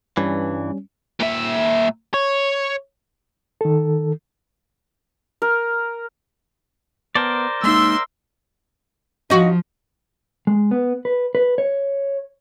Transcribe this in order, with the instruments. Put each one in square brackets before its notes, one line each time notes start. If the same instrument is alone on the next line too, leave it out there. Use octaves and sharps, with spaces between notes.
[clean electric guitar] G2 E3 [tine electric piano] G3 C#4
[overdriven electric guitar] A#2 E5
C#5
[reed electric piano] D#3 A4
[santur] A#4
[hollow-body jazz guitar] B3 A5 [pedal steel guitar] A#4 C5 D5
[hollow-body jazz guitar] G#3 A#3 D#4 [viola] E5 C6 [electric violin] E6
[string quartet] F3 [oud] D#4 F#4
[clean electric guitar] G#3
B3
B4
B4
C#5